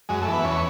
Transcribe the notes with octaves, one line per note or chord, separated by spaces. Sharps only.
F#2 G#3
A3
E3
B3
E2 C#4